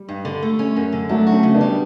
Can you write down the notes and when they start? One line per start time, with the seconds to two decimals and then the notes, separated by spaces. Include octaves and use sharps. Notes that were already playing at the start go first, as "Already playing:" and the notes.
Already playing: G3
0.09 G2
0.25 D3
0.42 A3
0.59 C#4
0.76 F#2
0.93 D3
1.09 F#3 A3 D4
1.27 F#4
1.32 A3 C#4
1.43 C#3
1.55 B3 D4
1.61 G3